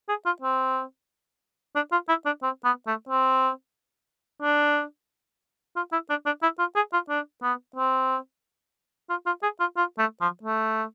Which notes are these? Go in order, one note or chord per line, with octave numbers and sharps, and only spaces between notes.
G#4
F4
C4
D4
F4
E4
D4
C4
B3
A3
C4
D4
F4
E4
D4
D4
E4
F4
G#4
F4
D4
B3
C4
F4
F4
G#4
F4
F4
A3
F3
A3